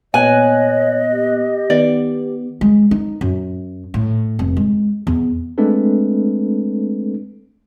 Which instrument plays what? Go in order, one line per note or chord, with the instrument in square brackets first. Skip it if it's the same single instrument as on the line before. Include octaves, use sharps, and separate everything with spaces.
[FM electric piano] A#2 B3 F#6 [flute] C#5 [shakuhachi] D#5 [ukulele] G#5
[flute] G4
[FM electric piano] D#3 B3 [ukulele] D5
[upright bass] G#3
D#4
F#2
A2
F1
G#3
E2
[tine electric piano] G#3 A3 C4 D4 A4 B4